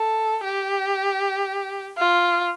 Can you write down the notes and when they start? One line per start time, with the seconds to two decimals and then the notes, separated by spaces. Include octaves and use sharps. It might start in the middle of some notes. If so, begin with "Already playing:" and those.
Already playing: A4
0.45 G4
1.98 F4